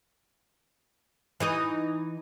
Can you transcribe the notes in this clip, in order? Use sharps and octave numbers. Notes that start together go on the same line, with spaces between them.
E3 D#4 D#5